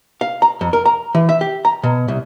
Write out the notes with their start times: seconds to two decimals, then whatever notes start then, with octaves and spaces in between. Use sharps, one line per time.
0.21 F5
0.42 A#5
0.61 F2
0.73 A#4
0.86 A#5
1.15 E3
1.29 E5
1.41 G4
1.65 A#5
1.83 B2
2.08 C2